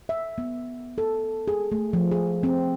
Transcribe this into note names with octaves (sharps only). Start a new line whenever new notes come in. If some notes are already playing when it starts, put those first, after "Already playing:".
E5
B3
A4
G#4
A3
F3
G#4
C4